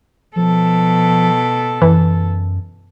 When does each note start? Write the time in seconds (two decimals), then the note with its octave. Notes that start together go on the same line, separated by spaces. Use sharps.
0.36 B2 F3 A4
1.82 F#2 E3